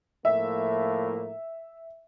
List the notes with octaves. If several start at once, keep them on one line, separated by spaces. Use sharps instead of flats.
A2 F3 A#3 E5